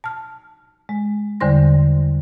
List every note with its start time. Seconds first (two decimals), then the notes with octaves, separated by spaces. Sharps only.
0.04 A5 F6
0.89 G#3
1.40 E2 D3 G3 C5 C6 A#6